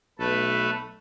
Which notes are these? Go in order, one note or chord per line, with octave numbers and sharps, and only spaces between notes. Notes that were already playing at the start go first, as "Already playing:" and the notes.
B1 A3 A4 B4